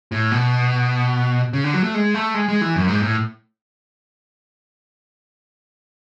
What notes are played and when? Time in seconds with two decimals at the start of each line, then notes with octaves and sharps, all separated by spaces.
0.12 A2
0.31 B2
1.53 C#3
1.64 D3
1.74 F#3
1.84 A3
1.94 G#3
2.14 A3
2.34 G#3
2.49 G#3
2.61 E3
2.75 F#2
2.88 G#2
3.02 A2